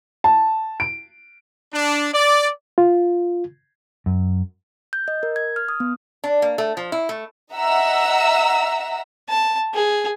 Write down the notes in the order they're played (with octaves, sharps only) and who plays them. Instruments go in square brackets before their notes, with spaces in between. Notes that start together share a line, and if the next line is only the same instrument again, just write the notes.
[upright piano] A5
D7
[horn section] D4
D5
[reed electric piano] F4
[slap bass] F#2
[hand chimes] G6
D#5
A#4
G#6
F6
D#6
B3
[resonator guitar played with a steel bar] D4
A#3
A3
F3
E4
A3
[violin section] D#5 E5 F#5 A#5 E6
[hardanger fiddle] A5
G#4